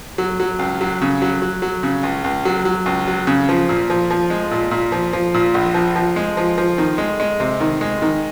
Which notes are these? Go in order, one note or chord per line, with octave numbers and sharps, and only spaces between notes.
F#3
F#3
C#2
F#3
C#3
F#3
F#3
F#3
C#3
C#2
C#2
F#3
F#3
C#2
F#3
C#3
F3
A#2
F3
F3
G#3
A#2
A#2
F3
F3
A#2
A#1
F3
F3
G#3
F3
F3
D#3
G#3
G#3
C3
D#3
G#3
D#3